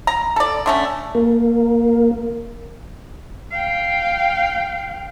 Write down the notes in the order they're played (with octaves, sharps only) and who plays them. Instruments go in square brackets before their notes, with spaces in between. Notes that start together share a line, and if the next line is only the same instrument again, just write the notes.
[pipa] A#5
A4 D5
D3 A3 C#4
[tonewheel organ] A#3
[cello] F5 G5